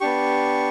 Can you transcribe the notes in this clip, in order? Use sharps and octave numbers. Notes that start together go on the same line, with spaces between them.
B3 D4 G4 C#6